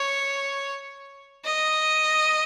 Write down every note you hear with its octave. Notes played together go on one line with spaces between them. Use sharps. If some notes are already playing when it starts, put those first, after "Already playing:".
Already playing: C#5
D#5